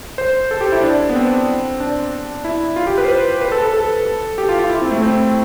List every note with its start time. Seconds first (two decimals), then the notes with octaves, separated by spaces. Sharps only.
0.18 C5
0.51 A4
0.61 G4
0.72 E4
0.83 D4
1.09 B3
1.16 C4
1.80 D4
2.44 E4
2.76 F4
2.87 G4
2.98 B4
3.04 C5
3.08 B4
3.41 B4
3.52 A4
3.62 A4
3.74 A4
4.38 G4
4.49 F4
4.59 F4
4.70 E4
4.81 C4
4.91 A3
5.02 C4